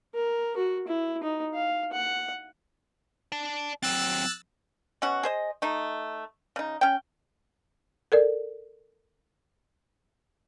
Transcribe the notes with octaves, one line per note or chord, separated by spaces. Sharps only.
A#4
F#4
E4
D#4
F5
F#5
D5 A5
F#3 C4 E6 F#6 A6
B2 C#4 F#4
G#4 C5 D#5
A3 D#4
C#3 D#4
C#4 G5
A4 A#4 D5